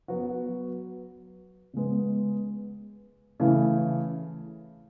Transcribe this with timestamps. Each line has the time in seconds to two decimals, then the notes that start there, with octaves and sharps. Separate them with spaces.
0.08 F#3 B3 F#4
1.74 C#3 G#3 B3
3.40 C#3 E3 A3 E4